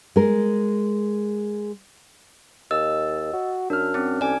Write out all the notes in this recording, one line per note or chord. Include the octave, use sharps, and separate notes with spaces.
G#3 A#4
D#2 D#5 E6
F#4
F#2 D4 F6
C4 C#4
C2 D5 G#5